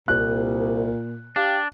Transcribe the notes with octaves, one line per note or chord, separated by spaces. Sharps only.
C2 A#2 F#6
D4 G4 F5